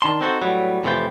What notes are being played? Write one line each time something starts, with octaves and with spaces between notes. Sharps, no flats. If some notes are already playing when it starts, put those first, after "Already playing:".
D#3 D4 A5 C6
C4 D#4 F#4 A4 C5
A2 F#3 G3 B3
F2 A2 C3 E3 F4 G5